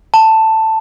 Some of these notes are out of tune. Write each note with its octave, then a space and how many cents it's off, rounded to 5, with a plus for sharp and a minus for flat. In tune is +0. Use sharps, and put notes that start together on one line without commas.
A5 +10